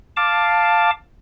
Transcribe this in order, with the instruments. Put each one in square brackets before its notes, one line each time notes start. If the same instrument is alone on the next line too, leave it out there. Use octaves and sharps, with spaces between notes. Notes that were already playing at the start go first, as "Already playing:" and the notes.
[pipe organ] F5 A5 D6